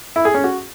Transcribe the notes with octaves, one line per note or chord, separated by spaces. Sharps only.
E4
G#4
C#4
F#4